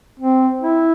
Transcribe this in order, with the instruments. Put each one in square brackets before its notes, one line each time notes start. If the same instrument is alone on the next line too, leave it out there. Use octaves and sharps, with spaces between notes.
[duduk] C4
E4